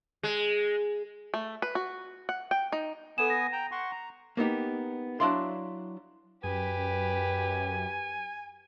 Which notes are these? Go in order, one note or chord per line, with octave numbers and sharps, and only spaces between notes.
G#3
A3
B4
F#4
F#5
G5
D#4
B3 A4 G#5 D#6 E7
A#6
G5 A#5
F#5 C6 C#6
A#5
A#3 B3 D#4 G4
F#3 D4 E4 D5 F5 C6
F#2 G4 B4 G#5